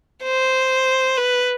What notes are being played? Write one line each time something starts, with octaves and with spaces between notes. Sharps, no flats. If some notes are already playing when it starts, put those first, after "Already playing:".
C5
B4